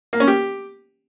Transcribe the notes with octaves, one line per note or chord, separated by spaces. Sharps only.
A#3
C#4
G4